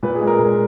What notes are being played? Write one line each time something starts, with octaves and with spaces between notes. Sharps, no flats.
A#2 B4
G#4
G#3
A#4
A#2